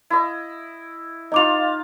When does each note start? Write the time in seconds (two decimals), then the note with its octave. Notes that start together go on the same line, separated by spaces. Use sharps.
0.10 E4 D#5
1.32 D#4 F4 D#5 D6 F7